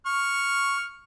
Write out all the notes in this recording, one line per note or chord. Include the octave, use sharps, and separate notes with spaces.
C#6 F6